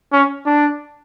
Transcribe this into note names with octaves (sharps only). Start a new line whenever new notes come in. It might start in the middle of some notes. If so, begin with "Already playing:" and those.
C#4
D4